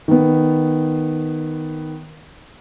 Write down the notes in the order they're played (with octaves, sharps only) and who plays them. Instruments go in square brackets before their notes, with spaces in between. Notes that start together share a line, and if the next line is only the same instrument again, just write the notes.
[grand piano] D#3 B3